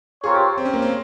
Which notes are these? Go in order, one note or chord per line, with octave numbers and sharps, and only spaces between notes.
C4 F4 G#4 A#4 C#5
G4
C4
C#4
A#3
C4